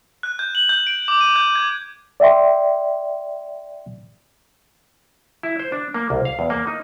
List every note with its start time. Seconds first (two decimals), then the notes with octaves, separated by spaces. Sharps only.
0.23 F#6
0.39 G6
0.55 F#7
0.69 G6
0.87 D7
1.08 D6
1.21 D#7
1.36 G6
1.56 G#6
2.20 D5 E5 G5 C6
5.43 E4
5.60 C5
5.72 D4
5.94 A#3
6.10 C2
6.25 F5
6.39 E2
6.50 A#3
6.67 D#4